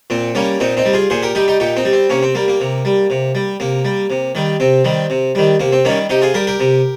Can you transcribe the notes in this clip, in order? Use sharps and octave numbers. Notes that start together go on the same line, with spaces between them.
A#2 C4
G3 A#3 C#4
A#2 C4 D#4
C4 D#4
G3
F4 G#4
A#2 G#4 C5
G4 A#4
G3 D#4 G4
D#4 G4
A#2 D#4 G4
C4 D#4
G3
C4
C3 A#3 C#4
C4
G3 A#3
A#3
C3
G3
C3
G3
C3 A#3
G3
C3
D#3 G3
C3 C4
D#3 G3
C3
D#3 G3
C3 A#3
C4
D#3 G3 A#3 C#4
C3 D#4 G4
F4 G#4
G3 G4 A#4
G4 A#4
C3